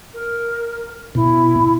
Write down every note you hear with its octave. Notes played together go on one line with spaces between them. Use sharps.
A#4
B2 E4